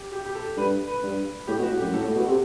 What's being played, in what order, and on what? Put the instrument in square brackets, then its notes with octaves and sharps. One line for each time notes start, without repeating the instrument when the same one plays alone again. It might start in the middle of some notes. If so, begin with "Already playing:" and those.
Already playing: [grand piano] G4
G4
G4
A4
[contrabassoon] G2 [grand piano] B4
[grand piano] B4
[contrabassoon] G2
[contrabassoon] A2 [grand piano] G4
[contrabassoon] B2
[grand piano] F#4
[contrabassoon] A2
[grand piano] G4
[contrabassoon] F#2
[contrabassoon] A2 [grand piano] A4
[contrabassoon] A2
B2
C3